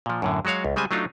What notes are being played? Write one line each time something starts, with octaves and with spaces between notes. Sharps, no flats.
A#2 F3
F#2 A2 D3
F#3 G#3 F#4 C#5 F5
C#2
C#3 G3 G#3 C5 G#5
F#3 A3 D4 D#4 F4